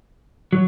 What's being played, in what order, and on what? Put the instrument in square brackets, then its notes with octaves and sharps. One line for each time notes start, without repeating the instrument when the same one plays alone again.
[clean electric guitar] F#3